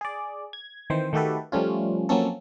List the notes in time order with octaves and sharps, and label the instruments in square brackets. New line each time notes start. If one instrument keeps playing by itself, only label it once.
[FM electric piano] G#4 D5
G#6
D#3 E3 C4 C5
D#3 A3 F#4 G4 A4 B4
F3 G3 A3 C#4 F4
F3 F#3 A#3 C4 C#4 A4